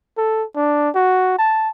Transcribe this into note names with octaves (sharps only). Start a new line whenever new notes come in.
A4
D4
F#4
A5